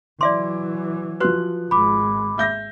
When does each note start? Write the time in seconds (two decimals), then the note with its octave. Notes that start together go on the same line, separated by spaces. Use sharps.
0.21 E3 F#3 D5 E5 C6 D6
1.20 F3 F#4 B4 F#6
1.71 G#1 G#3 B5 D6
2.38 E5 G6 A#6